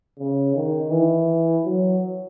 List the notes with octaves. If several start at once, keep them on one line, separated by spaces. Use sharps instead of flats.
C#3
D#3
E3
F#3